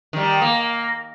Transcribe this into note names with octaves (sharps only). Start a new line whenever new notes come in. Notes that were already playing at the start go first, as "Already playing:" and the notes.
D#3 G3
A#3